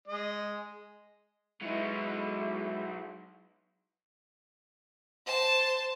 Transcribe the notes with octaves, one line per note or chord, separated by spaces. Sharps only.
G#3 D#5
F#3 G#3 D#4 E4
C5 A5